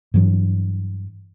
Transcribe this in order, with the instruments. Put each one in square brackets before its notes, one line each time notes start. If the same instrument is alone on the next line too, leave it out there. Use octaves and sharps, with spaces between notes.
[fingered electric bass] G2 E3 F#3